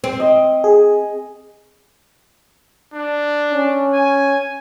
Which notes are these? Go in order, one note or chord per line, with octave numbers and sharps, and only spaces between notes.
C4
D#5
G#4
D4
C#4
G#5